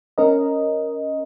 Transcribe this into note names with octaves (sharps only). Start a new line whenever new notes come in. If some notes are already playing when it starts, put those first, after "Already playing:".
C#4 A#4 D#5